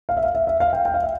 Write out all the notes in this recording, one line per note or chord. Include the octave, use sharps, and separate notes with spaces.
F5
E5
F5
E5
E5
F5
G5
G5
F5
E5